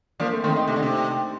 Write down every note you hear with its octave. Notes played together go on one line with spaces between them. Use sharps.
F3 A#3 D4
A3 C4
D#3 A3 C4
C4 D#4
C3
D3
C3